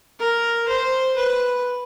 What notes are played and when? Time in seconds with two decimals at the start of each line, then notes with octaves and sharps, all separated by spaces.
0.20 A#4
0.68 C5
1.17 B4